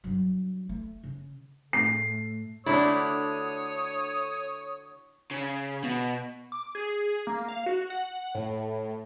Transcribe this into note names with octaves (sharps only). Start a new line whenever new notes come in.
G2 F#3
A3
C#3
A2 A3 C7
D3 A3 D4 E4 F#4 C#5 D#6
C#3
B2
D6
G#4
A#3
F5
F#4
F#5
A2